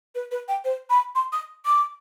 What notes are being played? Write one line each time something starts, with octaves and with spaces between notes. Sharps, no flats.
B4
B4
G5
C5
B5
C6
D#6
D6